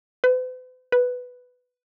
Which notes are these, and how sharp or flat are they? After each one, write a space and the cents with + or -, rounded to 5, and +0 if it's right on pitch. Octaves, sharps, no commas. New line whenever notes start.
B4 +45
B4 +5